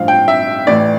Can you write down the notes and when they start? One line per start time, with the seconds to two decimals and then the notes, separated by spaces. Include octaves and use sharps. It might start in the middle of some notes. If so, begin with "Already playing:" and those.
Already playing: A1 G2 F3 F5
0.08 G5
0.28 E5
0.67 A1 A2 E3 D5